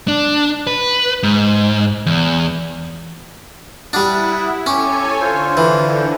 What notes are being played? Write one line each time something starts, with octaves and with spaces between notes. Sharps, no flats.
D4
B4
G#2
E2
G3 D4 E4 F#5 D#6
C#4 G4 A4 C#5 G#5
D3 F4 C5
E3